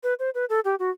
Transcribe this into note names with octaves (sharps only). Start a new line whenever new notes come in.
B4
C5
B4
A4
G4
F#4